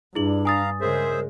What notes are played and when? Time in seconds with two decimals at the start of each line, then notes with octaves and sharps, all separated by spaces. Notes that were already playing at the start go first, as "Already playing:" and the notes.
0.15 G2 D4 E4 G#4 F#7
0.45 F5 G#5 A#5 D#6 A6
0.81 C#3 G#3 G#4 A#4 C5 E5